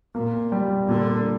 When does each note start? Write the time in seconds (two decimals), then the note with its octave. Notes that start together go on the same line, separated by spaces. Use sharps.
0.15 A#2 A#3
0.52 G3
0.88 A#2 D3